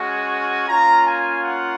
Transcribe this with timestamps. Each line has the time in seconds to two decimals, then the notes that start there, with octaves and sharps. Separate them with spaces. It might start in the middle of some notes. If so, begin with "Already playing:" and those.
Already playing: G#3 C#4 F#4 G#5
0.67 A#3 C#4 F4 A#5
1.06 G#5
1.43 F#5